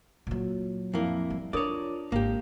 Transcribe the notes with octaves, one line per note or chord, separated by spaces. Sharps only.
A#2 F#3
F2 A#3 E4
G3
D4 F4 A#4 C#5 D5 D#6
G#1 A#3 G4